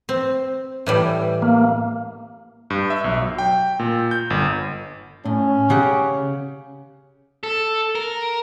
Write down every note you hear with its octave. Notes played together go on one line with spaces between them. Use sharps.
C4
A2 E3 G3
A#3
G2
E5
B1
F#3
G5
A#2
G6
G1
A2 C#4
C#3 G4 F#5
A4
A#4